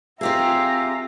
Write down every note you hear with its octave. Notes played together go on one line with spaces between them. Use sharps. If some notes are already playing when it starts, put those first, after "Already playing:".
C4 F4 G4 G#4 E5 F5 A#5